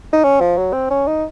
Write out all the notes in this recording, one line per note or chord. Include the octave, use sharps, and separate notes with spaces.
D#4
C#4
F3
F#3
C4
C#4
D#4